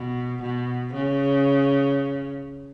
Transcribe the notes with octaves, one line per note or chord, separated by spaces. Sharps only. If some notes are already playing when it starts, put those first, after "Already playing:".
Already playing: B2
B2
C#3